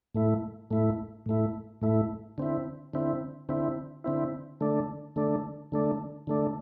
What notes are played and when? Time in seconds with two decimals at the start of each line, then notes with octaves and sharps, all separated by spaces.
0.15 A2 A3 E4
0.71 A2 A3 E4
1.26 A2 A3 E4
1.82 A2 A3 E4
2.38 D3 C4 E4
2.94 D3 C4 E4
3.49 D3 C4 E4
4.04 D3 C4 E4
4.61 D3 A3 D4
5.16 D3 A3 D4
5.72 D3 A3 D4
6.27 D3 A3 D4